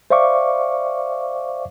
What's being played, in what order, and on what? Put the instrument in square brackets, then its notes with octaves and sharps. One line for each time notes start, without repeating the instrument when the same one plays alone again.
[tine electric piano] C5 D5 E5 F5 C#6 D6